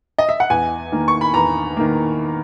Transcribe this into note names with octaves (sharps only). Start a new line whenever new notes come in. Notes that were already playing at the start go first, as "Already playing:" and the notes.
D#5
E5
F#5
E2 G#5
D#3 A#3
C#6
B5
E2 A#5
D#3 A#3